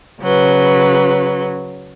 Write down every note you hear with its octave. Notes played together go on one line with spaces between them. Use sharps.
C#3 F#3 B4